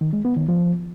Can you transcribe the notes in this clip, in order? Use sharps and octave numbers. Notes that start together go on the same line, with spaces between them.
D#3
G#3
B3
D#3
F3